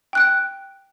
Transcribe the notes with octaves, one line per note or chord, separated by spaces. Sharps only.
G5 F#6 D7